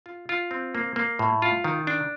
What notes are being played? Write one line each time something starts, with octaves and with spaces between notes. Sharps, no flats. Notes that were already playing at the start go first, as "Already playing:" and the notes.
F4
F4
C4
A#3
A#3
A2
F4
D#3
D4